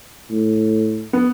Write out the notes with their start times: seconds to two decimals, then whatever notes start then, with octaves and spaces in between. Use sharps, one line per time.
0.30 A2
1.13 B3